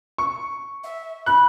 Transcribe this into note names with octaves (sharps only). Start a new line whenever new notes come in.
C#6
E5
B5 F#6